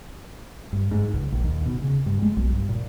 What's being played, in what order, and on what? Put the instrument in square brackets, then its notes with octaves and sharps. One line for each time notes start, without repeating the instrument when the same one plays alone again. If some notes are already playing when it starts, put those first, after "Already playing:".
[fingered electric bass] G2
G#2
C#2
A#1
D#2
B2
C#3
G2
G#3
B1
G2
A#2